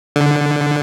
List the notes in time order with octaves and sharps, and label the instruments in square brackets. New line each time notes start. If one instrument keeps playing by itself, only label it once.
[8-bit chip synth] D3